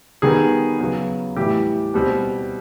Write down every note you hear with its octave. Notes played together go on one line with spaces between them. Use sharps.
D#3 G3 B3 G#4
C#3 F#3 B3
A2 E3 G3 G4
B2 G3 C4